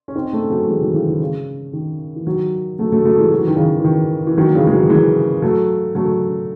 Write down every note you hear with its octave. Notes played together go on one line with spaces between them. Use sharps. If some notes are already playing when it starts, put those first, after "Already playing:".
C#4
C4 D#4
A3 C#4
F#3 A3
E3 G#3
D#3 F#3
C#3 E3
D#3
C#3
D#3
E3
D#3 F#3
F#3 A3
F#3 A3
F#3 A3
E3 G#3
F#3
E3
D#3
C#3 E3
E3
D#3
E3
D#3 F#3
F#3
C#3 E3
G#3
D#3 F#3
E3 G#3
F#3 A3
F#3 A3